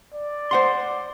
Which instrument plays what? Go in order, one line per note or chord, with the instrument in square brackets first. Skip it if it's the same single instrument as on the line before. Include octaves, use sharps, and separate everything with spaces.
[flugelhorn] D5
[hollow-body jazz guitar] C5 F#5 C6